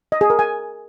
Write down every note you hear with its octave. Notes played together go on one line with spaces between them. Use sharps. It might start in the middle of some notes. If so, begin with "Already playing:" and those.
D#5
G#4
A#4
G#5